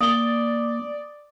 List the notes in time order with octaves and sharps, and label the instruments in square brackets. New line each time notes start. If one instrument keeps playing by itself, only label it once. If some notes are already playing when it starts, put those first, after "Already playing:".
[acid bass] A#3 [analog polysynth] D5 [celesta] D#6 G7